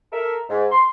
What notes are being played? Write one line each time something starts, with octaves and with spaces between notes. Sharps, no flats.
A4 A#4 E5
G#2
C6